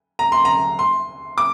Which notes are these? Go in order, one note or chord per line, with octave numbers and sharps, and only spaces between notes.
A#5
C6
A#5
C6
D6